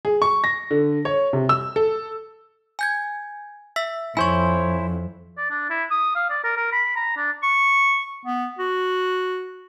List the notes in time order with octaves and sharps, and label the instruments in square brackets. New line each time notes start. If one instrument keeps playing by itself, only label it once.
[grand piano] G#4
C#6
A#6
D3
C#5
C3
E6
A4
[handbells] G#5 G6 G#6
E5 E6 B6
[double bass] F2 [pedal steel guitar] E4 C5 C#5 [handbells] G#5 C#6
[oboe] D5
D4
E4
D#6
F5
D5
A#4
A#4
B5
A#5
D4
[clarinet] C#6
B3
F#4